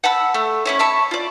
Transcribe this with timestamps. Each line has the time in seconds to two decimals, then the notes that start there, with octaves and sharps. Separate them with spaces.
0.04 F#5 A5 B5 E6
0.34 A3
0.65 C#4 E4 C#5
0.79 E5 A5 B5 C#6
1.11 F4 D5